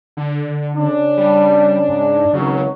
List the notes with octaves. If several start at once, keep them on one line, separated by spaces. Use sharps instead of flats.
D3
C#3 C#4 D4
G3
G#2
G#1 C#2 C#3 F#3